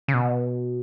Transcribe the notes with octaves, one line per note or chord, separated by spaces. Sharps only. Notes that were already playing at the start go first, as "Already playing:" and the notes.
C#3
B2